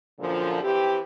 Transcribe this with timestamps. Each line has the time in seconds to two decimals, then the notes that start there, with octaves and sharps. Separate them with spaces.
0.19 F#2 A#2 D3 F3
0.62 E3 C4 G4